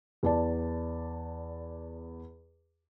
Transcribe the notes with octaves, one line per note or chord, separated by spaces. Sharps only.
E2 D5 A5